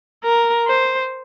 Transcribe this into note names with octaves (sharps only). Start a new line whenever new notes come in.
A#4
C5